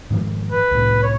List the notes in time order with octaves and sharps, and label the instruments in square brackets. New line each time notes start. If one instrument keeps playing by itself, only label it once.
[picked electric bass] G#2 D#3 F3
[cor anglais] B4
[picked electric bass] C2 A2
[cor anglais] C#5